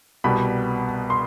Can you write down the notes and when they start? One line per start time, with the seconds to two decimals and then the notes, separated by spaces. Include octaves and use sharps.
0.24 C2 B2 G3 B3 B5
1.10 C6